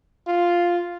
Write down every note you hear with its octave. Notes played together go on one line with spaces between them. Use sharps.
F4